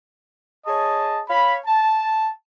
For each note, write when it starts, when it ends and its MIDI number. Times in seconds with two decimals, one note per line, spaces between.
0.66 1.22 68
0.66 1.22 73
0.66 1.22 75
0.66 1.22 81
1.29 1.57 73
1.29 1.57 77
1.29 1.57 83
1.66 2.29 81